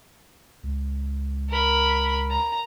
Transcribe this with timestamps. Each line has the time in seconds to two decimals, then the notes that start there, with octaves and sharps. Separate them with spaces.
0.64 C#2
1.50 A#4 B5
2.31 A#5